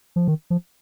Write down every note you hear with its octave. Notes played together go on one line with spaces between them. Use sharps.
F3
D#3
F3